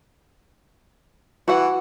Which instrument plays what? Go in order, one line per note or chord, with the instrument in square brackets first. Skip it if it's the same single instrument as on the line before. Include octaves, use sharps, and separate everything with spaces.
[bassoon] E3 [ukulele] F#4 F#5